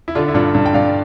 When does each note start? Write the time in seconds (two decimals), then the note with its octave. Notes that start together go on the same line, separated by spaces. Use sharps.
0.08 E4
0.15 D3 D4 F4
0.28 E4
0.34 G2 D4 F4
0.55 G2
0.66 G5
0.74 G2 D5 F5